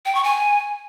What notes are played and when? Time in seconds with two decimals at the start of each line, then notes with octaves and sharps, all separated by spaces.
0.06 G5
0.15 C#6
0.24 G#5